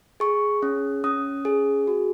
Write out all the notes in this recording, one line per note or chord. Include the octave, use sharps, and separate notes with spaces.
G#4 C#6
C#4
C#4 D#6
G#4
F#4